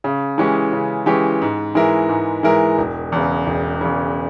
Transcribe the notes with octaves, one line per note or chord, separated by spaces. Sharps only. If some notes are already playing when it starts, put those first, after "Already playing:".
C#3
E3 G#3 C#4 G4
C#3
E3 G#3 C#4 G4
G#2
E3 G#3 E4 A#4
G#2
E3 G#3 E4 A#4
E1
E2 C#3
E1
E2 C#3